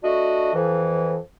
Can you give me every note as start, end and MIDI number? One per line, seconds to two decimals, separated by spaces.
0.03 0.51 57
0.03 0.51 62
0.03 0.51 66
0.03 0.51 75
0.54 1.17 41
0.54 1.17 52